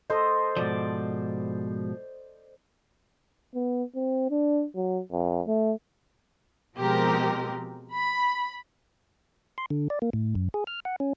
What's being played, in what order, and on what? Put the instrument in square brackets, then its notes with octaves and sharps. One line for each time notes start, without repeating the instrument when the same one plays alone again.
[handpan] A4 D#5 [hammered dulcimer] C5
[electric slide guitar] G#2 B2 F3 [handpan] D5
[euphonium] B3
C4
D4
F#3
F2
A3
[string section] B2 F3 G#3 C4 G4 A#4
B5
[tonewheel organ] C6
D3
D5
A#3
A2
F#2
G#4
F6
F#5
C#4